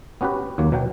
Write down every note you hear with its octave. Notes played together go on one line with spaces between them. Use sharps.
B3 C#4 F#4 G4 B4
D#2 F#3 A#3
B2 F#3 F#5 G5